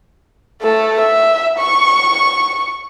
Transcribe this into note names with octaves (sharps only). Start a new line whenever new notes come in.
A3 A4
E5
C#6